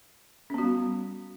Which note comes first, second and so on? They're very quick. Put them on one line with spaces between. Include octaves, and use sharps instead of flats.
C#4 B3 F#4 G3